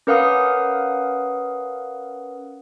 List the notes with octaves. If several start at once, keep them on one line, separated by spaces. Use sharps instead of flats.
C#4 A#4 B4 F5 F#5 D#6